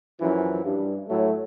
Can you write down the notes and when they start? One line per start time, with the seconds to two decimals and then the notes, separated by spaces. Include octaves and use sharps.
0.20 F#2 E3 F3
0.64 G2
1.08 A2 F#3 A3